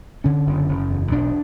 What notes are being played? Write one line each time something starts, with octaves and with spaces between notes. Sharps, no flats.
D3 C#4
F#1
F#1
E2
B1 D4